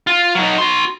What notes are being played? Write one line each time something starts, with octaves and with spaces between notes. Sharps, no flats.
F4
F#3 D#4
F#4 C6